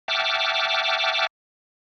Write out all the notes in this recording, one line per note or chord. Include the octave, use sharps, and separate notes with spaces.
E5 F#5 G5 A5 D6 F6